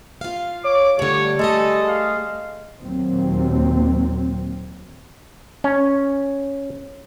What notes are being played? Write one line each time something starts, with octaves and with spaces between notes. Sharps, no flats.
F4 F5
C#5 D6
D3 G3 A3 C#5
G#3 A3 G#4 A4 D#5
F5
D#2 A#2 F#3 C4
C#4